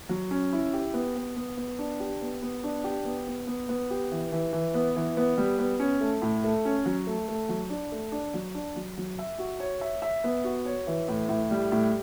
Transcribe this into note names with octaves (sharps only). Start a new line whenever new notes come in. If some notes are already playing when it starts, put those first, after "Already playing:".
F#3
C#4
E4
G4
B3
B3
B3
B3
D4
G4
B3
B3
D4
G4
B3
B3
B3
B3
G4
E3
E3
E3
B3
E3
B3
G3
B3
C#4
A3
A2
A3
C#4
F#3
A3
A3
F#3
D4
A3
D4
F#3
D4
F#3
F#3
E5
F#4
C#5
E5
E5
B3
F#4
C#5
E3
A2
A2
G3
A2